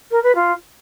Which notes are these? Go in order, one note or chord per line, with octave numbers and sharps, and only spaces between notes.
A#4
B4
F4